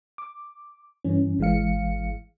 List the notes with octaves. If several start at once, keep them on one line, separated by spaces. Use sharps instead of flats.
D6
G2 E3 C#4
G#1 E3 G#3 F5 C#7